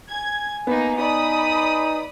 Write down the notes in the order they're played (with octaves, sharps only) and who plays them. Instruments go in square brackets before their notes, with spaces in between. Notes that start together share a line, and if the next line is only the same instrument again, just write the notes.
[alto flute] G#5 [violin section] G#6
[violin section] A#3 D#4 [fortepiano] B3
[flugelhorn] D#4 [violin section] D5 B5 D#6